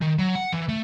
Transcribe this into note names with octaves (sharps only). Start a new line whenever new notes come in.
D#3
F#3
F#5
E3
A3